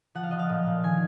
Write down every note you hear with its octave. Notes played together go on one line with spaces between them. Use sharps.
F3 F#5
F5
F3 D#5
F5
A#2
A#2
D#3 G#5